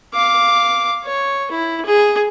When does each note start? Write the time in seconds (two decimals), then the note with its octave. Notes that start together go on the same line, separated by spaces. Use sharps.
0.14 F5 D6
1.04 C#5
1.51 E4
1.86 G#4